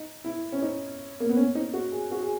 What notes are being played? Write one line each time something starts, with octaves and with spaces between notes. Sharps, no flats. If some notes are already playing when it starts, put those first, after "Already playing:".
Already playing: D#4
E4
C#4
D#4
A#3
B3
C#4
D#4
F#4
G#4
F#4
G#4